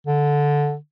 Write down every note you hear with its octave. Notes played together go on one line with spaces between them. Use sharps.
D3